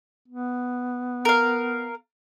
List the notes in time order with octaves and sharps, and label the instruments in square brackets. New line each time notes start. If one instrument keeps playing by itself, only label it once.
[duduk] B3
[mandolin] A#4 F5